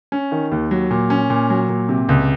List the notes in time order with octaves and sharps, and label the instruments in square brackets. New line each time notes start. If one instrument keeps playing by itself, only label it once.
[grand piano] C#4
D#3
D#2
F#3
A#2
C#4
A#2
F#3
A#2
C3
C#2